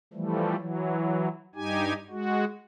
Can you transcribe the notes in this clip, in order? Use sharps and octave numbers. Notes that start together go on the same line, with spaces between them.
E3 F3 G3 A3
E3 F#3
G2 D#4 G4 G#5
G#3 F#4